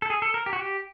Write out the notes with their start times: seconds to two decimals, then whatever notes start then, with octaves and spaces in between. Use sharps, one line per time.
0.02 A4
0.10 G#4
0.22 A4
0.34 A#4
0.46 G4
0.53 F#4
0.59 G4